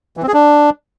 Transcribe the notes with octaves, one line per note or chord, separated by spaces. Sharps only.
E3
C4
G#4
D4